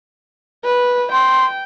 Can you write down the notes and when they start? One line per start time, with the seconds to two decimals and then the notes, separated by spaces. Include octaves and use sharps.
0.65 B4
1.12 G5 C6